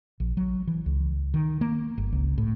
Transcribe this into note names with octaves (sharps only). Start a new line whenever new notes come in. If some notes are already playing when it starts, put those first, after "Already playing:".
A#1
F#3
E3
C#2
D#3
A#3
G1
C#2
A2